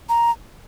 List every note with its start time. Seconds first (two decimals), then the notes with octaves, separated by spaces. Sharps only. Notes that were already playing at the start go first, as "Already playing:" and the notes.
0.09 A#5